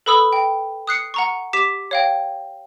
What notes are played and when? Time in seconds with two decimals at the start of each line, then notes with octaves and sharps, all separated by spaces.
0.06 A4 B4 B5 D#6 E6
0.33 G5
0.87 D#6 F#6 C7 C#7
1.14 F#5 A#5 C#6
1.53 G4 D6 B6 E7
1.91 C#5 F5 G5